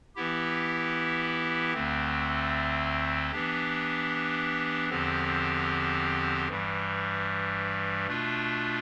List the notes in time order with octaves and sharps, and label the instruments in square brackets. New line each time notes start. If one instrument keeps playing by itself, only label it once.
[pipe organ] E3 B3 E4 G4
D2 D3 A3 C4
E3 B3 D4 G4
E2 D3 F3 C4 G4
G2 E3 G3
B2 A3 D4 F4